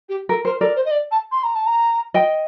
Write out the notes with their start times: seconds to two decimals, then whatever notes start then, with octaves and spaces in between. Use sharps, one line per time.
0.09 G4
0.29 A4 A#4
0.45 A#4 C5
0.60 A4 A#4 D5
0.76 C5
0.85 D#5
0.91 D5
1.11 A5
1.32 C6
1.43 A#5
1.55 A5
1.66 A#5
2.14 D#5 G5